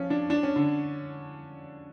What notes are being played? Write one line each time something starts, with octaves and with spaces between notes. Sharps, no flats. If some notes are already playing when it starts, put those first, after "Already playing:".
Already playing: F3 C#4
D4
D4
C#4
D3